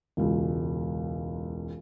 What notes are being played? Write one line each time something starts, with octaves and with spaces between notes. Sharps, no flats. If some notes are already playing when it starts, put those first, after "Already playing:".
E1 C#2